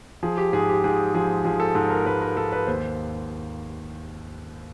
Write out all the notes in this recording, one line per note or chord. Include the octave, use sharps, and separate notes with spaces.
F3 G#4
G4
G#2 G#4
G4
G#2 G#4
F3 G#4
F3 G#4
A4
G#2 A4
A#4
G#2 B4
A#4
G#2 A4
B4
D#2 C5